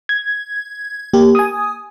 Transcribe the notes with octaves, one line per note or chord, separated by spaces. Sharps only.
G#6
A#3 G4
G#5 D#6